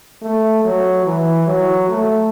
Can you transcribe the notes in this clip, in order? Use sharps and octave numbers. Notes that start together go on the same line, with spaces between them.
A3
F#3
E3
F#3
A3